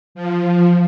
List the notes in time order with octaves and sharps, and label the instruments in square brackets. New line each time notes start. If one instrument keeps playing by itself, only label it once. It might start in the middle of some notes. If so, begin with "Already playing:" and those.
[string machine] F3